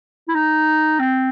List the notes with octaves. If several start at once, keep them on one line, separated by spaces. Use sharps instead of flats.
E4
D#4
C4